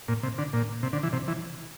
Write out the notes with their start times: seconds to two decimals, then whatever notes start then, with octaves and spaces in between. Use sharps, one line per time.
0.08 A#2
0.23 C3
0.38 D3
0.53 A#2
0.83 C3
0.93 D3
1.03 E3
1.13 C3
1.28 E3